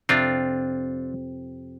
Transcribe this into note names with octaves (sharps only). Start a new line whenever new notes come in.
F2 C3 C4 D4 F4